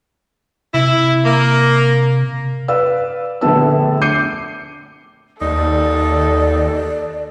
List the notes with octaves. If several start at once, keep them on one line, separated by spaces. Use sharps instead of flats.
C3 E4
A#3
B4 D5 F5 E6
A#1 D3 A3 B3 A5 E6
D6 G6 C7 C#7 D#7
D#2 D#4 A4 D5